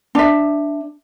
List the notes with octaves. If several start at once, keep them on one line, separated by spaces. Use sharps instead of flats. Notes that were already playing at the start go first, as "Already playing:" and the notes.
D4 E5